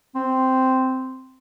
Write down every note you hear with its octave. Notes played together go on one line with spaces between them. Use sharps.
C4